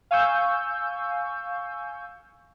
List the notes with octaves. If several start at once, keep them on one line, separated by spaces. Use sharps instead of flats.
F5 G#5 C#6 E6 G6